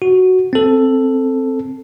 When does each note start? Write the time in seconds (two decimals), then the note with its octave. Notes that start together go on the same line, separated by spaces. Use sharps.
0.02 F#4
0.53 C4 A4